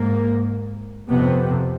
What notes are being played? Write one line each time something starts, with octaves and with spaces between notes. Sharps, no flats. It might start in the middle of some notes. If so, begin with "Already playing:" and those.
Already playing: G#2 A#3
F2 C3 B3